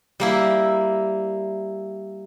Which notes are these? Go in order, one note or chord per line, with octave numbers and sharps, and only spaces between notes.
G3 A#3 E4